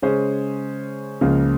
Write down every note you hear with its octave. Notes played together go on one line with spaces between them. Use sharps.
C#3 G#3 C#4 G#4 C5
C#2 C#3 F3 A#3